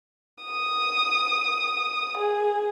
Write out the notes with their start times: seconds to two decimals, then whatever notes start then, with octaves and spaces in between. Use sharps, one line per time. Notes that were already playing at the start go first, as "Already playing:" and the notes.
0.44 D#6
2.17 G#4